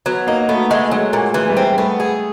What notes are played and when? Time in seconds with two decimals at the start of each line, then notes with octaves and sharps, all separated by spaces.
0.06 F#3 B3
0.27 A#3 D#4
0.49 A3 B3
0.70 G#3 A3
0.91 F#3 G#3
1.13 A#2 A3
1.34 E3 G#3
1.50 G3
1.57 C4
1.63 G3
1.78 A3 B3
2.00 G#4